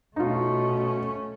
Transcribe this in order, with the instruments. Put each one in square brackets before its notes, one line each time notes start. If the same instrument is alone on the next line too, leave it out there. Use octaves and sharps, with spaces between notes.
[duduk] B2 [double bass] A3 C#4 [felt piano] D#4 F4